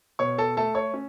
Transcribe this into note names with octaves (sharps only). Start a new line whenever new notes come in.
B2 C#5 C#6
A4 A5
A3 A4 A5
C#5 C#6
C#4